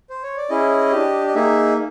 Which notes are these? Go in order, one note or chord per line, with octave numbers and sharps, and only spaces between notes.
C5
C#5
D5
C#4 E4 G#4 D#5
D4 G4
D#5
A#3 D#4 G#4 E5